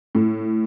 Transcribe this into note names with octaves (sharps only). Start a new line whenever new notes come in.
A2